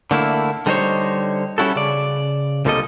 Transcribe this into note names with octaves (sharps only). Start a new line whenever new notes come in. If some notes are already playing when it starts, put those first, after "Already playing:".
D3 A3 A#3 E4
D3 G3 D#4 A4 C5 C#5
G3 C#4 E4 F#4 A4
C#3 D5
C2 A#2 D3 G3 A4 D#5